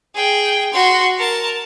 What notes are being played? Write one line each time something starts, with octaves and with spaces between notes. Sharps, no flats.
G#4 G5
F#4 C6
A#4 A5